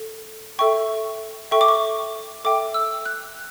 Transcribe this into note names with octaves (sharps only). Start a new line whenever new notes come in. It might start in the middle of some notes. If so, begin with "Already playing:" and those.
Already playing: A4
A4 E5 G5 C#6
A4 E5 G5 C#6
D6
C#6
A4 E5 G5 D6
E6
F#6